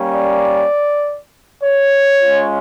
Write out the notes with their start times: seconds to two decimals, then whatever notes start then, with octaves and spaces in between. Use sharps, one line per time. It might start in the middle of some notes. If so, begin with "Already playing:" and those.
Already playing: G3 A#3 C#4
0.11 D5
1.61 C#5
2.21 G#3 C#4 F4